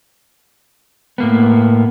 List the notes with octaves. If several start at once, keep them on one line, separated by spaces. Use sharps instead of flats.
A2 A#3 B3